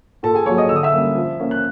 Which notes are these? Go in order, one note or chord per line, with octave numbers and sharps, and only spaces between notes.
A#2 A4 A5
G#4 G#5
F#3 A#3 C#5 C#6
D#5 D#6
D3 E6
D#6
E5 E6
G3 A#3 C#4
F3
A#3 C#4
F#6